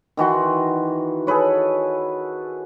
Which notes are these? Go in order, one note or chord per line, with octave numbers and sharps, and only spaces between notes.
D#3 E3 F#4 C6
G#4 A4 B4 C#5